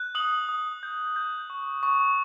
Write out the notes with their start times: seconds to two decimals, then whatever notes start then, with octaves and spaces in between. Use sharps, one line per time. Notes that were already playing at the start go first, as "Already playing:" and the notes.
Already playing: F#6
0.15 D#6 F#7
0.49 D#6
0.83 G6
1.16 G6
1.50 C#6
1.83 C#6